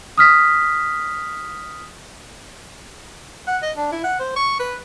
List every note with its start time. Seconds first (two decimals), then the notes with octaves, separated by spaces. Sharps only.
0.18 D#6 F6 B6
3.47 F#5
3.63 D#5
3.77 D4
3.92 E4
4.04 F#5
4.19 C5
4.36 C#6
4.60 B4